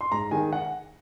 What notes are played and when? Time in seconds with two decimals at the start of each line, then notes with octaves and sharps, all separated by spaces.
0.01 C6
0.12 G#2 A#5
0.31 D#3 G#3 G#5
0.53 F#5